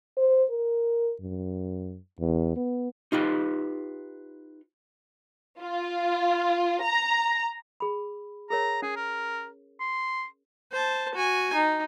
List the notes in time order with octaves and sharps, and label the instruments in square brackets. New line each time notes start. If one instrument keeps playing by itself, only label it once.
[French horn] C5
A#4
F#2
E2
B3
[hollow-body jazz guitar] D#4 F4 G4 B4
[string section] F4
A#5
[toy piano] G#4 B5
[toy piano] G#4 A#4 C#5 [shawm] A#5
[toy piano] C#4 [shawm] G#4
[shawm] A#4
C6
[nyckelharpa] C5 A5
F#4 G#5
D#4